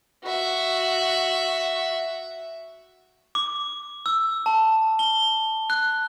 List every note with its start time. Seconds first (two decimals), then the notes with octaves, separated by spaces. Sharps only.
0.25 F#4 E5
3.35 D6
4.06 E6
4.46 A5
4.99 G7
5.70 F#6